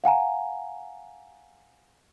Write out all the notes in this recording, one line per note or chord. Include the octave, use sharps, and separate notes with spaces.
F5 F#5 G#5 A#5